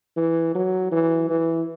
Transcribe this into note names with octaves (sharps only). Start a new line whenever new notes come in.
E3
F#3
E3
E3